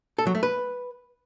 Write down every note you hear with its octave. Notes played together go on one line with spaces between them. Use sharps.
A4
F#3
A3
B4